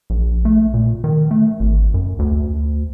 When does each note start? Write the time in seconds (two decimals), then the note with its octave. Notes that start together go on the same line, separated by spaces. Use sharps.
0.10 A#1
0.45 A3
0.74 A#2
1.04 D#3
1.31 A3
1.60 G#1
1.94 F#2
2.19 D2